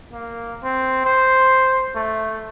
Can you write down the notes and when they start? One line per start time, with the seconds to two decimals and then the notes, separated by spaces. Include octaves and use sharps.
0.13 A#3
0.64 C4
1.05 C5
1.96 A3